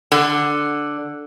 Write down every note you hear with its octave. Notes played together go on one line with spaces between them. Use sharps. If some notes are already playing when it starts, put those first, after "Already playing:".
D3